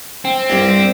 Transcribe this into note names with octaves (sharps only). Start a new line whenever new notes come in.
C4
C2 G2